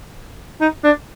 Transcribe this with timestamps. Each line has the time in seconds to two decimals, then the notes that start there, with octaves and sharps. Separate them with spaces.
0.61 D#4
0.84 D4